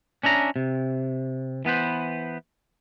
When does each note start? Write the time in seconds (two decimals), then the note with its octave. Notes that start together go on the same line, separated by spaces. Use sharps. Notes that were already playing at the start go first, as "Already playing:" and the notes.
0.23 C#4 D4 E5 A#5
0.56 C3
1.65 E3 B3 B4 C5